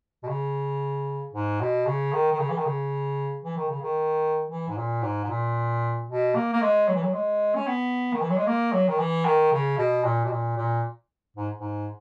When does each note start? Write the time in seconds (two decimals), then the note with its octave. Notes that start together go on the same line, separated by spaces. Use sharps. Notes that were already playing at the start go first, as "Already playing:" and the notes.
0.23 B2
0.28 C#3
1.33 G#2
1.61 B2
1.87 C#3
2.12 D#3
2.33 D#3
2.39 C#3
2.50 E3
2.58 D#3
2.66 C#3
3.44 E3
3.57 D#3
3.69 C#3
3.82 D#3
4.51 E3
4.68 G#2
4.77 A#2
5.03 G#2
5.24 G#2
5.29 A#2
6.09 B2
6.35 A#3
6.53 A#3
6.62 G#3
6.88 F#3
6.95 E3
7.03 F#3
7.14 G#3
7.56 C#4
7.67 B3
8.13 D#3
8.21 E3
8.30 F#3
8.38 G#3
8.47 A#3
8.73 F#3
8.88 D#3
8.99 E3
9.25 D#3
9.53 C#3
9.78 B2
10.04 A#2
10.25 B2
10.31 A#2
10.58 A#2
11.37 G#2
11.60 G#2